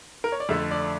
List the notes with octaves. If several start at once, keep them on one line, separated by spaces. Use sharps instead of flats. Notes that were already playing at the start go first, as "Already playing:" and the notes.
A#4
C#5
D5
F2 D3 A3 E5
D5